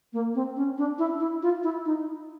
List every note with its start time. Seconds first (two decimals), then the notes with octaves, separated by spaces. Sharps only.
0.13 A#3
0.35 C4
0.56 C#4
0.78 D4
0.99 E4
1.20 E4
1.43 F4
1.63 E4
1.86 D#4